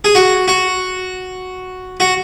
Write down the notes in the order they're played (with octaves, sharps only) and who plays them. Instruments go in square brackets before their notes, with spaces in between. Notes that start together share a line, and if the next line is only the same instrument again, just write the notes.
[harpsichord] G#4
F#4
F#4
F#4